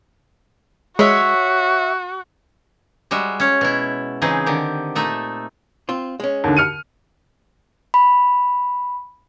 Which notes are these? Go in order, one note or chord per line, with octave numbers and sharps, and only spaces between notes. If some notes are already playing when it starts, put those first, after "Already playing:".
G#3 F#4 C#5 E5
G3 G#3 F#4 E5
C#4 C#5
B2 E4
C#3 E3 C4 D#4 G#4
D3 D#3 G4
A#2 A3 D#4 E5
C4 F4
G#3 C#4
D#2 D3
F6 C#7 D#7
B5